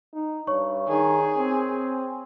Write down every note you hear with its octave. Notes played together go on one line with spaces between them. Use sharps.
D#4
G2 C#5 C#6
D#3 G#4
C4